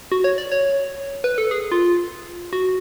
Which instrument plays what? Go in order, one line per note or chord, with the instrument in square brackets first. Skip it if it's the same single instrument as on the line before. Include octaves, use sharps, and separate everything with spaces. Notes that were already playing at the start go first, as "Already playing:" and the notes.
[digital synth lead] F#4
C#5
D5
C#5
B4
A4
G#4
F4
F#4